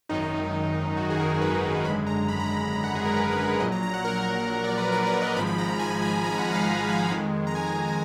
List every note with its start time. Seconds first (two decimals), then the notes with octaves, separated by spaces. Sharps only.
0.09 G#1 F#2 D#3 D#4
0.97 F#4
1.10 G#4
1.19 A#4
1.41 B4
1.85 G#1 F#2 D3 G#3 B5
2.07 A#5
2.28 B5
2.40 A#5
2.51 B5
2.62 A#5
2.73 A#5
2.84 F#5
2.95 G#4
3.05 A#4
3.17 B4
3.31 B4
3.46 B4
3.60 A#1 A#2 F#3 D#5
3.72 A#5
3.83 A#5
3.94 F#5
4.05 A#4
4.64 D5
4.78 B4
4.92 A#4
5.06 B4
5.22 D#5
5.36 G#1 G#2 F3 G#3 B5
5.46 B5
5.58 A#5
5.69 A#5
5.79 G#5
6.02 B5
6.24 A#5
6.32 G#5
6.38 F#5
6.53 F5
6.67 F#5
6.89 G#5
7.11 F2 D#3 G#3
7.47 A#5
7.55 G#5
7.66 A#5
7.88 G#5